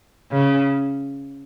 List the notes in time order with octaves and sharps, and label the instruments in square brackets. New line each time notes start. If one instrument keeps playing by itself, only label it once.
[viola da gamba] C#3